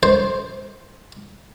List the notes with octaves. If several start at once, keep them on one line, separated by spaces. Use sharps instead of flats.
C5